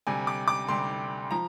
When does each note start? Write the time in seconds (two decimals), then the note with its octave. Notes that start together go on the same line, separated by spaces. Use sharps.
0.07 D2 C3 G3 G#5
0.27 D6
0.48 D6
0.68 D2 C3 G3 C6
1.31 F3 A#5